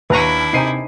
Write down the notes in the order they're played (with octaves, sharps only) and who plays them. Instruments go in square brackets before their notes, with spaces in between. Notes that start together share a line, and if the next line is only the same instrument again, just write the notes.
[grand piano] D#2 D#7 [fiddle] D4 E4 [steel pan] B4 A#5 C#6
[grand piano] C3 C7 D#7 [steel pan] D#4 C5 G#5